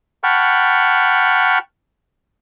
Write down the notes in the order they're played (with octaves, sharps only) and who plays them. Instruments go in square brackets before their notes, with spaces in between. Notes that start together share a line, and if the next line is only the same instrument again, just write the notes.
[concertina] F#5 G5 A5 B5 C#6 F6